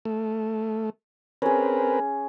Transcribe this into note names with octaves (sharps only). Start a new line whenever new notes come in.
A3
C4 C#4 G#4 A#4 B4